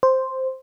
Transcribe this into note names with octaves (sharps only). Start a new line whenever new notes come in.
C5